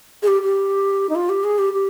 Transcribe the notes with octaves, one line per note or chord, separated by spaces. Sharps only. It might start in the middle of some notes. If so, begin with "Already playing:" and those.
G#4
G4
G4
D#4
F4
G4
G#4
G4
G4